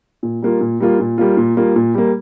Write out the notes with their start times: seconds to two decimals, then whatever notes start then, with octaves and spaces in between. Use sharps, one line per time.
0.23 A#2
0.42 G3 A#3 F4
0.61 A#2
0.80 G3 A#3 F4
1.00 A#2
1.18 G3 A#3 F4
1.37 A#2
1.57 G3 A#3 F4
1.76 A#2
1.94 G3 A#3